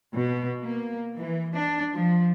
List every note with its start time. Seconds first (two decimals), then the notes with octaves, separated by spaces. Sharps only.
0.15 B2
0.61 A#3
1.17 E3
1.53 D4
1.96 F3